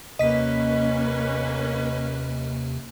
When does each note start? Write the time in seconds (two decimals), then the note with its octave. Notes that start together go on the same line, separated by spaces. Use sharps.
0.19 D#2 C3 A#3 C#4 B4 D#5 B6